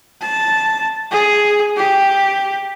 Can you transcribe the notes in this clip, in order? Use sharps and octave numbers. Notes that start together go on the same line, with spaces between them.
A5
G#4
G4